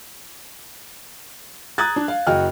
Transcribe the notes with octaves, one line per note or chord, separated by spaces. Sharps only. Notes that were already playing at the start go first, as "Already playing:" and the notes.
A#5 D#6 F#6 G#6 A6
D4
F5
F#1 F#4 D#5 G5 F6